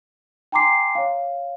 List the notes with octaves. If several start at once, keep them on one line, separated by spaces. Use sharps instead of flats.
G5 G#5 A#5 C6 D6 C7
C#5 F5